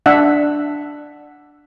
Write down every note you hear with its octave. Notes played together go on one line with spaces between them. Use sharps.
D4 E5 F#5